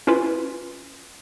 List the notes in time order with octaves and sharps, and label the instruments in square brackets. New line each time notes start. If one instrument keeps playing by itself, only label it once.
[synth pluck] C#4 E4 F4 B4